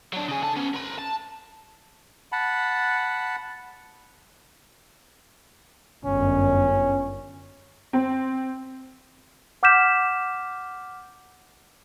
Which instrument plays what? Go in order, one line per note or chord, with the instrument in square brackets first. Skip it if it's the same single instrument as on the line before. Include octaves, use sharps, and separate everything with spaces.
[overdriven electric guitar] F#3 D4
C#3 G#4
D3 A5
B3 C#4
A#4 B5
A5
[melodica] F#5 A5 B5
[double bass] G1 F#2 [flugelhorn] C#4
[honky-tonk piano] C4
[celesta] F#5 D6 F6 G6 B6 E7